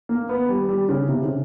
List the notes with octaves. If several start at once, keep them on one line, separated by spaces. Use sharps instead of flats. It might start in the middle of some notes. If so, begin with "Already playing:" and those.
A#3
B3
G3
G3
C#3
C3
C#3